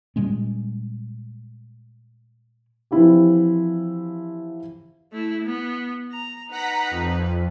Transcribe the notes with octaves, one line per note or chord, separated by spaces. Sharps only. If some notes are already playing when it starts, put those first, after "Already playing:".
A#2 G3 G#3 C#4
E3 F3 C4 E4 F4 G4
A3 E4
B3
A#5
D#4 B4 F#5 A#5 B6
F2